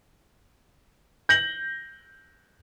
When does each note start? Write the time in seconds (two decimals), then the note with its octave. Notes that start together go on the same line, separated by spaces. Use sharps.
1.29 G6 A#6 F#7